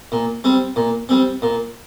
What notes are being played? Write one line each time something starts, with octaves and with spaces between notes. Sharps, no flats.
A#2
G3 C4
A#2
G3 C4
A#2